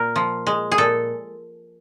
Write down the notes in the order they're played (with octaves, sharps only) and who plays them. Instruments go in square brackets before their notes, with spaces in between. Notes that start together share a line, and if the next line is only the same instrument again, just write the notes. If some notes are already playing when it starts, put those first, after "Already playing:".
Already playing: [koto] A#2 A#4
F3
G#3
G#4
A#2 A4